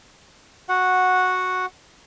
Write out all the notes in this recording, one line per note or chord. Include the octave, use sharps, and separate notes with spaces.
F#4 F#5